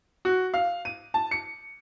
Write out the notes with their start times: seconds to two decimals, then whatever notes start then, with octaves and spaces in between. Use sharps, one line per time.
0.25 F#4
0.54 F5
0.85 D#7
1.14 A5
1.31 C#7